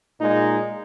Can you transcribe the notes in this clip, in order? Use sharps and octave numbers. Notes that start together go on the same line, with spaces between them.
A#2 G#3 D#4